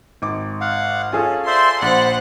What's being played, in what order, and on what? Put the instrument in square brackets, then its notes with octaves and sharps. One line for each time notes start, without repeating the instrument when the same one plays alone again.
[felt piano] G#1 D6
[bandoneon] F5 F#5
[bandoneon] C#4 [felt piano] F4 G#4 A4
[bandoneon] C5 D5 E5 [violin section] C6
[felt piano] A#1 [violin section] C5 F#5 [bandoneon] D5 B5